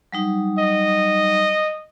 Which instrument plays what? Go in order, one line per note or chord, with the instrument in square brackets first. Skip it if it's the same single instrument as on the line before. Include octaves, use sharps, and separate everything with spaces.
[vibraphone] F#3 G3 D#4
[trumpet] D#5